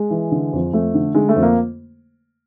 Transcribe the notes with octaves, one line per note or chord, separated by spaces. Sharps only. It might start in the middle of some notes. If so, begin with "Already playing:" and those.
Already playing: G#3
E3
D3
F2
F2 A3
D3
D3 G#3
A3
F2
A#3